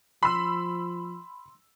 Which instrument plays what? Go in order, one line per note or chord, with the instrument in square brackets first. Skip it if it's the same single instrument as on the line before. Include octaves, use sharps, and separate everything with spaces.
[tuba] F3 [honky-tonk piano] B5 E6 [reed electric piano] C6